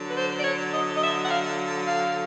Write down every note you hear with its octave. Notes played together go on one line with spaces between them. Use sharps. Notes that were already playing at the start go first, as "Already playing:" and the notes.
Already playing: D3 F#3
B4
C5
D5
C#5
D#5
D#5
E5
F#5
F5
F5